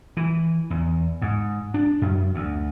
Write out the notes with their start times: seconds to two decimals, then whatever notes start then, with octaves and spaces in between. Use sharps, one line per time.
0.17 E3
0.70 E2
1.22 G#2
1.74 D4
2.02 F#2
2.35 D2